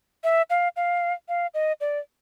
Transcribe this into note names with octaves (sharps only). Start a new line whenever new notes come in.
E5
F5
F5
F5
D#5
D5